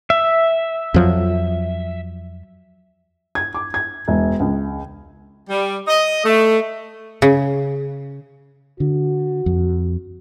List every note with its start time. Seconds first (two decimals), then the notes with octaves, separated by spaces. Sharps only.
0.10 E5
0.94 F2 F3 F#3
3.35 G#6
3.54 D6
3.74 G#6
4.08 E1
4.40 C#2
5.50 G3
5.88 D#5
6.25 A3
7.22 C#3
8.80 D3 F#4
9.46 F2